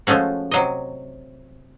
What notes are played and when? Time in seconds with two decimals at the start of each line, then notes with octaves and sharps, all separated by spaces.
0.07 F3 G#3 A3 C#4 F#4
0.51 C3 F#3 D#5